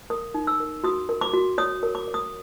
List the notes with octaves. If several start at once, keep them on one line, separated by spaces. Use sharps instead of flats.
A#4 D#6
D#4
E6
A#4
F#4 D#6
A#4
D6
F#4
C#5 D#6
A#4
D6
C#5
D#6